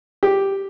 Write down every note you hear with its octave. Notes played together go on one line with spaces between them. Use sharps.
G4